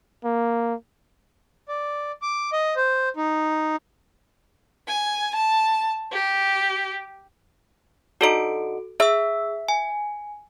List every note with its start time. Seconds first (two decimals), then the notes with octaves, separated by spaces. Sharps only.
0.24 A#3
1.68 D5
2.22 D6
2.53 D#5
2.76 C5
3.17 D#4
4.88 G#5
5.35 A5
6.12 G4
8.21 D3 D#4 F#4 A4 D7
9.00 G#4 E5 E6
9.69 G#5